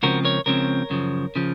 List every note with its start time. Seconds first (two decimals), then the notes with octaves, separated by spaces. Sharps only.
0.03 C#2 C#3 F3 C4 F#4 A#4
0.25 A#4 C#5
0.46 C#2 C#3 F3 C4 A#4 C#5
0.90 F#2 C#3 F3
1.36 C#3 F3